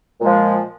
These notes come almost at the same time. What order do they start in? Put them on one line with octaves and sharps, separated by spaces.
A#2 G#3 F3